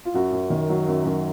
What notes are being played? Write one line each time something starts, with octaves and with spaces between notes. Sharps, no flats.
F4
F#2 F#4
F#2
D#3
F#3
F#2
F#2